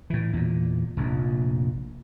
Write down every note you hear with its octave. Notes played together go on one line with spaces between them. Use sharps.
A2 E3
E2 A#2
F1 A#1 F2